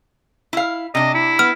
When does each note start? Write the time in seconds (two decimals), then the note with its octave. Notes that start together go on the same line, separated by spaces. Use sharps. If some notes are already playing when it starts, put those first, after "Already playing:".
0.53 E4 F5
0.95 C3 D4 D#5
1.14 E4
1.39 B3 F6